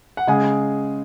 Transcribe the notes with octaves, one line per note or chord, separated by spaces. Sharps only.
F#5
C#3 G#3 G#5